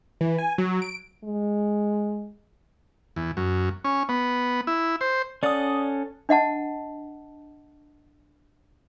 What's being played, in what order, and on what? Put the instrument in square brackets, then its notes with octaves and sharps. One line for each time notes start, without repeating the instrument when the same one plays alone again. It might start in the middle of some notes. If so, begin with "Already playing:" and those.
[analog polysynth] E3
G#5
F#3
D7
[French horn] G#3
[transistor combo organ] E2
F#2
C#4
B3
E4
C5
[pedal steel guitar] C#4 A4 F#5 [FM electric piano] D5 D#6
[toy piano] D4 D#5 F#5 A5